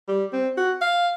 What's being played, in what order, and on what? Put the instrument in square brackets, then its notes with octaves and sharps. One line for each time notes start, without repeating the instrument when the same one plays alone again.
[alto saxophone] G3
C4
F#4
F5